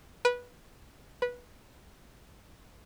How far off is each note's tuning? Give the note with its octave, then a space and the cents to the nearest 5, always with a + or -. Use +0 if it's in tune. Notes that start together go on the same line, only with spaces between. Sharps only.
B4 -15
B4 -15